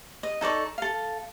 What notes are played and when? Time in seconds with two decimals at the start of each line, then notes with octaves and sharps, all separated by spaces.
0.23 D#5
0.41 D#4 A4 D5 C#6
0.78 A4 F5